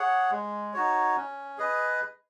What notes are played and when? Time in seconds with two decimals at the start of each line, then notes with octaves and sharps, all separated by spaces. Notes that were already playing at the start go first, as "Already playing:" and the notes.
Already playing: G#4 C#5 F#5
0.31 G#3
0.73 D#4 F#4 C#5
1.16 C#4
1.58 G#4 B4 D#5